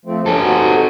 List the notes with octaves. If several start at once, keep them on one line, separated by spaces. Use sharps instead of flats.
F3 A3 C4
A#3 C#4 D4 G4 A4
C4 D#4 F#4